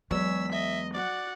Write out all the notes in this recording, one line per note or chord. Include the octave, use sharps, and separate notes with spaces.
E2 F#3 G#3 C#5 E6 B6
D#5 E5
F#4 D5 F#5